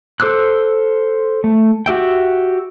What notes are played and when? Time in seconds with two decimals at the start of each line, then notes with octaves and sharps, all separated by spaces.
0.20 A4 C5 D6 E6 F#6
1.44 A3
1.86 F#4 G4 E5 G5